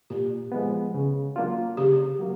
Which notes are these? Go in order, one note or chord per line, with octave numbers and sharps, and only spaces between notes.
A#2 G4
F3 G#3 B3
C#3
F#3 A#3 D4 F4
C#3 G4
F#3 A#3